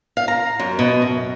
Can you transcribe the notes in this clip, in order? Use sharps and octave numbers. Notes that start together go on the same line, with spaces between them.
F5
A#5
F#2
B2
F#2